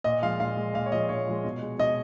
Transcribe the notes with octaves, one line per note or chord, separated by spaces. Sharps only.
A#2 D#5
F3 G#3 F5
A#2 F5
F3 G#3
A#2 F5
C#5
F3 G#3 D#5
A#2 C#5
F3 G#3
B2
G#3
B2 D#5